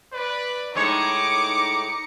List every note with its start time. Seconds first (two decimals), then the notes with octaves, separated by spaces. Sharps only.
0.13 B4 D5
0.75 A2 G#3 D#4 C#5 A#5 D6 C#7